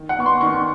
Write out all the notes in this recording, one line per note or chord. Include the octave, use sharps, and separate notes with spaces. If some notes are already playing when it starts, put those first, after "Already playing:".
Already playing: D#3
F#5
B3 C#6
C6
D#3 C#6